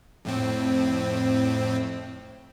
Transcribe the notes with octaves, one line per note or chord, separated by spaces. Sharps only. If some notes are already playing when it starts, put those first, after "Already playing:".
F2 A2 C4